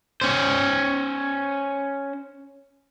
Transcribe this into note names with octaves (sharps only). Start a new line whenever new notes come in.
C#4 C5